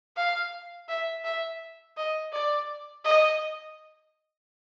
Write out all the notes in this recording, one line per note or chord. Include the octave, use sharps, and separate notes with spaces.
F5
E5
E5
D#5
D5
D#5